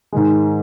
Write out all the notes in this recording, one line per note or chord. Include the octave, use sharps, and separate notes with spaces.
G#2 D#3 G#3